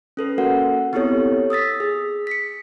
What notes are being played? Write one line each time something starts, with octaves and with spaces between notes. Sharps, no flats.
C#4 A4 B4
A#3 F#4 A#4 F#5
B3 C4 E4 G4 A4 C#5
D#6 E6 A6 B6
G#4
B6 C#7